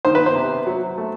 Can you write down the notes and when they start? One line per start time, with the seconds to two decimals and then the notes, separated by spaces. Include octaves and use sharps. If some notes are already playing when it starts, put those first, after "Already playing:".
0.05 D#3 C5
0.15 B4
0.26 C5
0.35 C3
0.67 F#3
0.98 A3